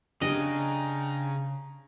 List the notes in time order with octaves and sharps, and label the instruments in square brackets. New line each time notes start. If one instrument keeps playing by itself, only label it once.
[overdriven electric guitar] C#3 [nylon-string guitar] D4 G4 [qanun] D#5 [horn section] G5 A5 A#5